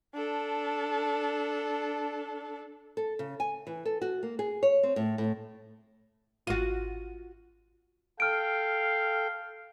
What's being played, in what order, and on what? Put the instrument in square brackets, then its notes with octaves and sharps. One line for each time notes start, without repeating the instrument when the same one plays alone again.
[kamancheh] D4 A4
[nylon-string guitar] A4
C#3
G#5
E3
A4
F#4
A#3
G#4
C#5
C4
A2
A2
[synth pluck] G#1 D#7 [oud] F4 F#4
[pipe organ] A4 G5 [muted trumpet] F5 [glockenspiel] F6 D7